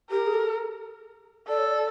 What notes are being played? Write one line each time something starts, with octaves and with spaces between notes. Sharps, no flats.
G4 A#4
G#4
A4
A4 D5
C#5
D5